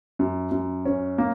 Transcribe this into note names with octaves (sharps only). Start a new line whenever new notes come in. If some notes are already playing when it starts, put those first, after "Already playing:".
F#2
F#2
C#4
A#3